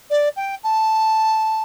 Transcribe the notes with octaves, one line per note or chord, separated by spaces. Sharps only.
D5
G5
A5